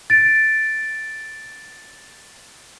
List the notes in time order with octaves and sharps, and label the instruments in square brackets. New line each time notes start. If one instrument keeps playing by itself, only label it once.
[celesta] A6 D7